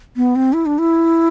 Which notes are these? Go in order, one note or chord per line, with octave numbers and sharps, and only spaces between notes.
B3
C4
E4
D4
E4